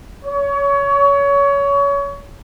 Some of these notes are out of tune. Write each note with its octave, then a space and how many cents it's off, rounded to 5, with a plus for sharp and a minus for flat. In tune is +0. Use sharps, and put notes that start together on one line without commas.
C#5 +25